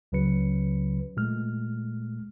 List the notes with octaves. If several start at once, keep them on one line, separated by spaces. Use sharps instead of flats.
C#2 C#3 F#3 B4 C#7
A#2 G#3 A3 F6